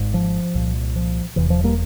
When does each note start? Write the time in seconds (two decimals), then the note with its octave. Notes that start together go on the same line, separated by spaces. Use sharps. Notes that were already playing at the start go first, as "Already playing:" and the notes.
Already playing: G#1 G#2
0.14 F3
0.55 C2 A#2
0.96 F3
1.36 E1 E2 C3 E3
1.50 F3
1.64 G3 A#3